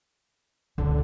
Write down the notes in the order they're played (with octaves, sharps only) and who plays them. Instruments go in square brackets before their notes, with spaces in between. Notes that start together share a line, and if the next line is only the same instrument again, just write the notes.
[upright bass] C#2 A#2 [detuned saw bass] D3